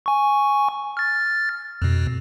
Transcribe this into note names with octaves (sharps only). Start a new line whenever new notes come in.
G#5 C#6
F6 A6
F2 B2